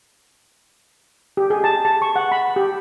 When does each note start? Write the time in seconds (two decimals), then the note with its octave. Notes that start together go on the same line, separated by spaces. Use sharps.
1.37 G4
1.50 G#4
1.64 A5
1.85 A5
2.02 C#6
2.16 F#5
2.32 B5
2.56 G4